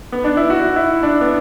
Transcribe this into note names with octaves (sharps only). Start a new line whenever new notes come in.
B3
D4
E4
F#4
E4
D4
B3